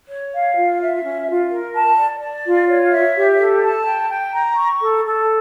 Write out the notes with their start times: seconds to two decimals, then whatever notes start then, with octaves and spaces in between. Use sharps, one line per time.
0.09 C#5
0.32 F5
0.56 F4
0.80 E5
1.03 C#4
1.27 F4
1.51 A#4
1.73 A5
1.97 D5
2.20 D5
2.45 F4
2.67 C#5
2.91 E5
3.14 G4
3.38 A4
3.62 A5
3.86 G5
4.09 G5
4.33 A#5
4.57 C#6
4.80 A4
5.04 A4